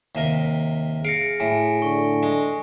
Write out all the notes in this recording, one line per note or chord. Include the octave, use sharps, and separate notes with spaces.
D#2 C3 A#4
G#4 F5 A#6 C#7 D7
A2 G#5
D3 C#6
G#3